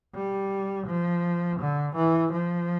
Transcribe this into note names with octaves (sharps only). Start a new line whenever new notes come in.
G3
F3
D3
E3
F3